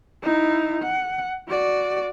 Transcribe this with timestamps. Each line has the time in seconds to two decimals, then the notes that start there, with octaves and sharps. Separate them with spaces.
0.22 D#4 E4
0.82 F#5
1.48 F#4 D5